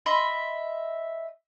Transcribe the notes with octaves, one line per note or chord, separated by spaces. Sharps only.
D#5 E5 B5 C6